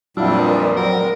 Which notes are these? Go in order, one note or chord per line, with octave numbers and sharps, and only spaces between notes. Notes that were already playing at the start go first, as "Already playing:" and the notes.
F2 A#2 F#3 G3 D4 E4 F4
A#4 B4 D#5
F#3 C4 A#4
G#3